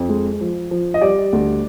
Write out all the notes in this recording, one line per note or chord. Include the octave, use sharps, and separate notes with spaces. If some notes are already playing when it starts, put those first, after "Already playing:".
Already playing: F2
G#3
F3
F3
D#5
G3 D5
D2